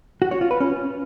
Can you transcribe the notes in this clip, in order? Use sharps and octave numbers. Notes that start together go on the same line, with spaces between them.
F#4
C#5
F4
B4
C#4